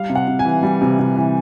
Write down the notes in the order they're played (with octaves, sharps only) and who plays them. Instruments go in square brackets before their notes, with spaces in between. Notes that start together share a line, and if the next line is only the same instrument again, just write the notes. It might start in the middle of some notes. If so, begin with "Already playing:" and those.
Already playing: [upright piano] G3 F5
C3
F#5
C3
G#5
E3
G3
C3
C3
E3